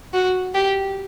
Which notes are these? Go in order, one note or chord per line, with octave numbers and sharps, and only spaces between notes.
F#4
G4